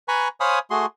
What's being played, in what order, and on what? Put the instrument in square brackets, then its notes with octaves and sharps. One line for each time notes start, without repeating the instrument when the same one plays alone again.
[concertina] B4 G#5 A#5 B5 C#6
C5 C#5 F5 G#5 B5 D#6
A3 F#4 G#4 C6